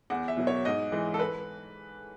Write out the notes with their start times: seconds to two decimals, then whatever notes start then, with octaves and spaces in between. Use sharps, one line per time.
0.10 E2 F#5
0.28 E5
0.37 B2 F#3
0.47 C#5
0.65 G#2 D#5
0.92 E3 G#3
1.14 A4
1.19 B4